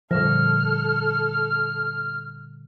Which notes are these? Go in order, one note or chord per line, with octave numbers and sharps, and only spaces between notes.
A#2 D3 F3 G3 A4 F6